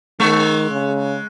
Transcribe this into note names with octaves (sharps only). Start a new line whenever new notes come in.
D#3 G#3
C#3